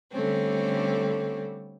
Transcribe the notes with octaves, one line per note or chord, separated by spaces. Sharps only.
D3 G3 A3 C4 C#4